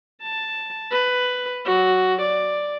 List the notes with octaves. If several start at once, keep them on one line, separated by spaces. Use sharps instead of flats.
A5
B4
F#3 F#4
D5